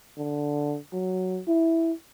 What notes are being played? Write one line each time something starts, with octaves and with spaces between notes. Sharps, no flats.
D3
F#3
E4